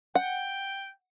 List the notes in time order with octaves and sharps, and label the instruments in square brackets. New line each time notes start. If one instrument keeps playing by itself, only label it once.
[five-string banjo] F#5 [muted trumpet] G5